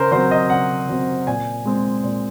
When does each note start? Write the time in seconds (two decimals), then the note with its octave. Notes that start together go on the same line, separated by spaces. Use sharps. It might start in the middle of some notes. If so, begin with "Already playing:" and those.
Already playing: C#3 A#4 C5
0.11 F#3 C4 C5
0.31 D#5
0.50 C#3 F#5
0.89 F#3 C4
1.27 A#2 G#5
1.65 G#3 C4
2.04 A#2